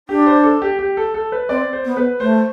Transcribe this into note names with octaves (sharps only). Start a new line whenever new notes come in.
D4 G4
C5
A4
G4
G4
A4
A4
B4
C4 D5
C5
B3
B4
A3 C5